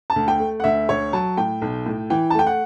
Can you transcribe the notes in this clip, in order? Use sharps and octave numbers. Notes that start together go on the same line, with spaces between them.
A5
D2
G5
A3
F#5
D2 E5
D2 C#5
F#3 A5
A2 G5
B1
A2
E3 G5
A5
A3 G5
F#5